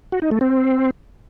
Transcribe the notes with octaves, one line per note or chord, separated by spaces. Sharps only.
F#4
D#4
A3
C4